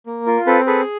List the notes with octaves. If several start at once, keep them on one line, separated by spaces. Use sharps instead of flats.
A#3
F4 A#4
C4 A4 B4
G#4 A4 B4